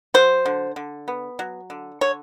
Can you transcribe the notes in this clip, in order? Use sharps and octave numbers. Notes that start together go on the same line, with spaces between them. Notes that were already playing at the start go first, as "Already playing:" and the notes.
F#3 C5
D3
D3
B3
F#3
D3
D3 C#5